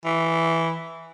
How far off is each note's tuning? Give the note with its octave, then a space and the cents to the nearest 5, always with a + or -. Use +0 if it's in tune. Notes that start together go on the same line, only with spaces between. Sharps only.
E3 +0